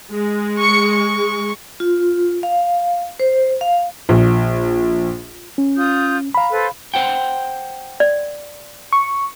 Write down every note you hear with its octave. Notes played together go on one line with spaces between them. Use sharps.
G#3
C#6 C#7
C#6
F4
F5
C5
F5
A#1
C#4
F4 D#6 G6
F5 A#5 B5
A4 B4 C5
C5 F#5 G5
D5
C#6